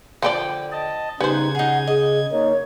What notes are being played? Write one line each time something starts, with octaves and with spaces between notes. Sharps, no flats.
D3 F3 B4 D5 G5
D#5 A5
C#3 G3 B3 C#4 D#4 C5 F#5 G#6
D#4 G#4 F#5
G#4 D#5
A#3 D#4 C#5